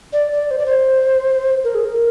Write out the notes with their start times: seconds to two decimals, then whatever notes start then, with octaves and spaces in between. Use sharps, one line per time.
0.13 D5
0.32 D5
0.51 C5
0.58 D5
0.66 C5
1.64 A#4
1.75 G#4
1.85 A#4